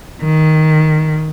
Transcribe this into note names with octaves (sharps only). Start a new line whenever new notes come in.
D#3